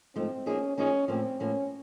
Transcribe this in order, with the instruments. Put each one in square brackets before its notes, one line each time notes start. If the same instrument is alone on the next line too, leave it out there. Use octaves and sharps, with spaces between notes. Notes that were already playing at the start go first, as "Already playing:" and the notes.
[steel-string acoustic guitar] G#2 F3 A3 [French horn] C4
[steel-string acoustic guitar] F3 A#3 D#4 G#4 [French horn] C#4
[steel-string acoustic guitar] F3 A#3 D#4 G#4 [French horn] C#4
[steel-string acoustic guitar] A2 F3 A#3 [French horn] C4
[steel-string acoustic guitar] A2 F3 A#3 [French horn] C#4